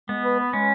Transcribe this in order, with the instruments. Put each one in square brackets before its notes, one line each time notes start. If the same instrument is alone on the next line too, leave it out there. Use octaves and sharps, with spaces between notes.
[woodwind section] G#3 [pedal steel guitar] B3
[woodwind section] B4
B4
[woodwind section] G#3 [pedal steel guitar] C#4